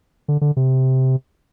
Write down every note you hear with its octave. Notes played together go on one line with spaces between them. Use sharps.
D3
D3
C3